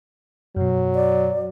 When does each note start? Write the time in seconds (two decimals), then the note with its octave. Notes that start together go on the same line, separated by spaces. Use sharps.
0.56 F#2 B2 F#3
0.95 D5